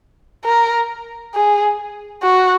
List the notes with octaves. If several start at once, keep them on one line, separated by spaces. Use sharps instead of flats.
A#4
G#4
F#4